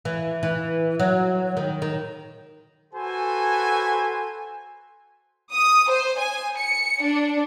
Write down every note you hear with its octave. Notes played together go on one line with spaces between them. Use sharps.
E3
E3
F#3
D#3
D#3
F#4 A4 B4 C5 G#5
D#6
C5
G#5
C#7
D4